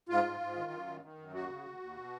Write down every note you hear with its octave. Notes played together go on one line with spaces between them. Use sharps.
G#2 F4
G#2
G#2
D#3
F#2
D#3
D#3
F#2
D#2 F#4
C#3
D#2
D#2
B2